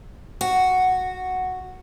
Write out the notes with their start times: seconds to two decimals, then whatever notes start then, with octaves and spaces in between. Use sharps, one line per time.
0.41 F#4